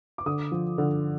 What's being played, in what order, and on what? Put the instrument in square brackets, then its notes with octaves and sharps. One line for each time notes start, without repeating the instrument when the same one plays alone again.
[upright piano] D6
D3 D#6
F3
D3